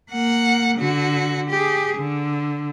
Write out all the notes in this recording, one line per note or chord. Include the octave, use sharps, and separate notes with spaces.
A#3 F#5
D3 F#4
G4 G#4
D3